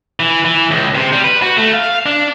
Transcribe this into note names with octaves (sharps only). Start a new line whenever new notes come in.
E3
E3
C#2
C3
G3
B4
F#4
A3
F5
D4